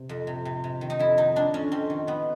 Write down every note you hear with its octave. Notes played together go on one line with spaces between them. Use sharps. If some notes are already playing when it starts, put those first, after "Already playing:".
Already playing: C3
F2
C3
C3
C3
D#3
D#4
F2 E4
D#3 D#4
D#3 D4
F2 C#4
F2 C4
D#3
D#3 B3